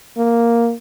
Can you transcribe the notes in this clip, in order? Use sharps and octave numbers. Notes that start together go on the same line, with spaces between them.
A#3